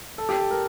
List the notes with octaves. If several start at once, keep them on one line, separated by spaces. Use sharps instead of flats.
A4
G4
A4
A#4